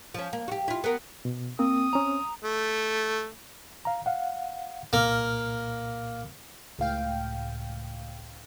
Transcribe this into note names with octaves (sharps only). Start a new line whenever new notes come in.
F3 C#4
A#3
F#4 G4
E4 F4
B3 A#4
B2
A#3 C4 D#6
C4 C#4 A#5
A3
F5 A#5
F5 F#5
C2 A#2 A#3 F6
C#2 A2 F5 G5